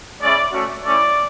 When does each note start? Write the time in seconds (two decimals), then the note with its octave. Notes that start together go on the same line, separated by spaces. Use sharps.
0.21 G#3 C#4 E4 D5
0.52 A3 C#4 F#4
0.83 A3 C#4 E4 D5